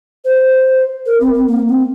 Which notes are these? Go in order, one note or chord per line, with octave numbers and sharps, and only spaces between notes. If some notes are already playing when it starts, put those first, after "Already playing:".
C5
A#4
C4
C4
A#3
C4